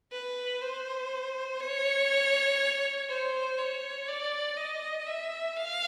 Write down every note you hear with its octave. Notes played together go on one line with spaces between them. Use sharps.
B4
C5
C#5
C5
C#5
D5
D#5
E5
F5